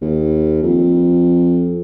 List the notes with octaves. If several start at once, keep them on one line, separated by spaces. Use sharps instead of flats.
D#2
F2